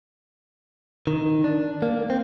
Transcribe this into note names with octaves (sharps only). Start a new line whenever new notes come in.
D#3
D4
A#3
C4